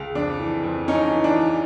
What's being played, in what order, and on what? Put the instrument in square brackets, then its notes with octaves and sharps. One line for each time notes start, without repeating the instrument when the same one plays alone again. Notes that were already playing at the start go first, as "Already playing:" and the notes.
Already playing: [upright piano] C#2
F2 D4
E3
F2
E3 C#4 D#4
E3
D4
E3